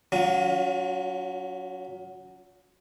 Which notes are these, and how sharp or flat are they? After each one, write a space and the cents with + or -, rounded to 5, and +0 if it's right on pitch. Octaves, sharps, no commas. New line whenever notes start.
F#3 +0 C#4 +35 F4 +35